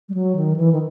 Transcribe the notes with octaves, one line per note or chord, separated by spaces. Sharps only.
G3
F#3
D#3
E3
D#3